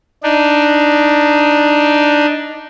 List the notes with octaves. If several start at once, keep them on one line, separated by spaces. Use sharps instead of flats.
D4 D#4